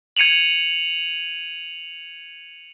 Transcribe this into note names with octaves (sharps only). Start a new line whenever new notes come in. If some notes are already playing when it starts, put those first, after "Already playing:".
G#6 C#7 D#7 F7 F#7